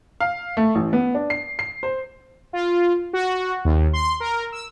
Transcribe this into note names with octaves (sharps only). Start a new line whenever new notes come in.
F5
A3
A1
B3
D4
C7
C7
C5
F4
F#4
D#2
C6
A#4
E6